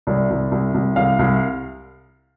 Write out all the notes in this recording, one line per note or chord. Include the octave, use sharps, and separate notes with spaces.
C2 D5
C2
C2
C2
C2 F5
C2